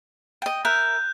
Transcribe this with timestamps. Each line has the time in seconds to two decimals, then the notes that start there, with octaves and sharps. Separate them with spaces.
0.42 D#5 G5
0.65 A#4 E5 F#6 G6